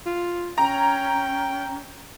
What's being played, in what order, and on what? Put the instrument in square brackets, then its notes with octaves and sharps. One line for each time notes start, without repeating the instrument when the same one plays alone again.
[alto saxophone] F4
[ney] C#4 [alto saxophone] G5 [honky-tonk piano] A#5